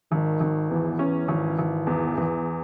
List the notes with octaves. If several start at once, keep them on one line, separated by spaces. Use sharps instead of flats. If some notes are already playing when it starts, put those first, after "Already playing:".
G#1 D#3
G#1
E2 E3
C#4
G#1
G#1
E2
E2